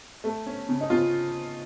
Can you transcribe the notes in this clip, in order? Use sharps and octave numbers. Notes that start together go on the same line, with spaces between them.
A3
C#4
C#3
D#4
C#3 F4